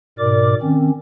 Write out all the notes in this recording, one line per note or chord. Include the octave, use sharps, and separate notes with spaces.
G#2 B2 A#4 D5 D6
D#3 C4 C#4